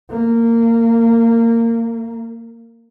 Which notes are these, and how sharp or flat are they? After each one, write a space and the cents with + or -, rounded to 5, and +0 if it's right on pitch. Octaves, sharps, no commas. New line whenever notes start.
A#3 -20